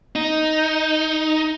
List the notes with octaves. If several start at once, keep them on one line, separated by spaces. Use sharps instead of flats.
D#4